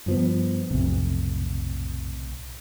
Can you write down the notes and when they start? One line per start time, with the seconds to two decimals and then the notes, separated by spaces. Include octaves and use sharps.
0.06 G2 F3 B3
0.71 B1 F2 A2 C3